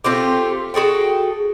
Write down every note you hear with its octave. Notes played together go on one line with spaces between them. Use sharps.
A3 C4 F4 G4
F#4 G#4 A4 G5